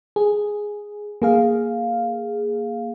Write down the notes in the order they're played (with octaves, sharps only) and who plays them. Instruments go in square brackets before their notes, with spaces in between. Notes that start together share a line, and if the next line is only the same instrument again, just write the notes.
[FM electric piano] G#4
A#3 G#4 F5